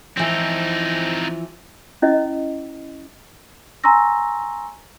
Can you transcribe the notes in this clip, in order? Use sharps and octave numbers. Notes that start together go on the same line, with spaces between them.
E3 F3 C4 D#4
C#4 E4 D#5
G#5 A#5 C6 C#6 E6 A#6